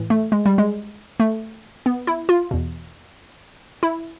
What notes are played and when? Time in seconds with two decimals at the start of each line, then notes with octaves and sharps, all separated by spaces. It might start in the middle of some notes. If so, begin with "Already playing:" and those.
Already playing: A2 E3
0.10 A3
0.32 G#3
0.46 G3
0.58 G#3
1.20 A3
1.86 B3
2.07 E4
2.29 F4
2.51 E2 B2
3.83 E4